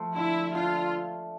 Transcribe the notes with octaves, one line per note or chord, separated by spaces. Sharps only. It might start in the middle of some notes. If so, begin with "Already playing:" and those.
Already playing: F3 A3
D3 E4
D3 F4